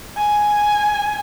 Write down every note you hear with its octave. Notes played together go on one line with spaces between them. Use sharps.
G#5